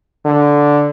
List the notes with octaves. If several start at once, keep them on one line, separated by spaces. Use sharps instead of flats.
D3